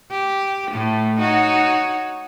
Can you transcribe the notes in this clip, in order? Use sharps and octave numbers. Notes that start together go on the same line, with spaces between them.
G4
A2 A3
D#4 F#4 C#5